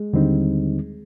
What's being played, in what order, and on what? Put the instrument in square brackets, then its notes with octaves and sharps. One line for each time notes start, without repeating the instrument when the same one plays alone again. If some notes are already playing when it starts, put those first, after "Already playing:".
Already playing: [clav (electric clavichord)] G#3
[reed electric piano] D#2 D3 G3 C4 D#4